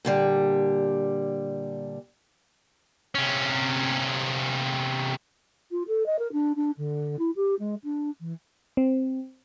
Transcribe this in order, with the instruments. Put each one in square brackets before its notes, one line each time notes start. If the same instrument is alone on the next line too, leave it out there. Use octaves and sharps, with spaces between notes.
[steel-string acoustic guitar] A#2 D3 G3
[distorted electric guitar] C3 C#4
[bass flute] F4
A4
D#5
A#4
D4
D4
D3
E4
G4
G#3
D4
E3
[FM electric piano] C4